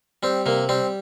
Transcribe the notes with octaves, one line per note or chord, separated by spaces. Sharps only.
G3 C4
C3 A#3
G3 C4